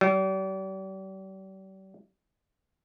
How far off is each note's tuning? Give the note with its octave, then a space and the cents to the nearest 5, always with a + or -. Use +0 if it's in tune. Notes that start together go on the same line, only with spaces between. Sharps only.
G3 -40